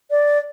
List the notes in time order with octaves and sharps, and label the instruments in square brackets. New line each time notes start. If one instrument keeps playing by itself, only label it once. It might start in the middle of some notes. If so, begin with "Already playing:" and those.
[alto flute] D5